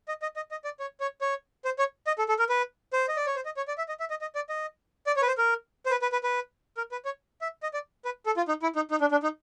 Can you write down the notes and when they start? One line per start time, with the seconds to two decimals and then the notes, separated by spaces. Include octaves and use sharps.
0.08 D#5
0.22 D#5
0.36 D#5
0.51 D#5
0.64 D5
0.80 C#5
1.00 C#5
1.21 C#5
1.65 C5
1.79 C#5
2.07 D#5
2.18 A4
2.29 A4
2.39 A#4
2.49 B4
2.93 C5
3.08 D#5
3.17 D5
3.27 C#5
3.35 C5
3.45 D#5
3.57 C#5
3.68 D5
3.78 E5
3.88 D#5
4.00 E5
4.10 D#5
4.21 D#5
4.35 D5
4.49 D#5
5.07 D5
5.16 C#5
5.22 B4
5.27 C5
5.38 A#4
5.86 C5
5.91 B4
6.02 B4
6.12 B4
6.24 B4
6.77 A#4
6.92 B4
7.05 C#5
7.41 E5
7.63 D#5
7.74 D5
8.05 B4
8.26 A4
8.37 F4
8.48 D#4
8.63 E4
8.76 D#4
8.91 D#4
9.01 D4
9.11 D4
9.23 D#4